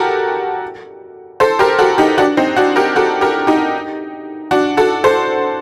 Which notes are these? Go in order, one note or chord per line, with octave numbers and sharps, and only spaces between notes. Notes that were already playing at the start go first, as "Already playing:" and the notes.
Already playing: F#4 G4 A4 A#4
A4 C5
G4 A#4
F#4 A4
D#4 G4
D4 F#4
C4 D#4
D4 F#4
G4 A#4
F#4 A4
G4 A#4
D#4 G4
D4 F#4
F#4 A4
A4 C5